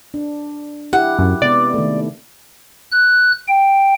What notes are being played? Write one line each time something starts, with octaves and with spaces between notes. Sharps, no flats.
D4
E4 G4 F#5
F#2
C3 G#3 B3 D5
D#3 A3
F#6
G5